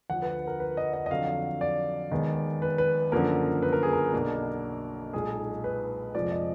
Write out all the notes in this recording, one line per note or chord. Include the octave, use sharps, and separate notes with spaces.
D2 D3 F3 F#5
B4
A#4
B4
D#5
D#5
D#5
F2 D3 F#3 F5
D5
D#2 D#3 G#3 B3
B4
B4
F#2 D3 F3 A#3 A#4
B4
A#4
G#4
A#4
B1 B2 A#3 D4
B1 A#2 G#3 D#4 G#4
B4
F1 F2 F3 G#3 D5
D#5